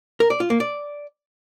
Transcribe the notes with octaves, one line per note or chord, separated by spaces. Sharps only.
A#4
D5
F4
A#3
D5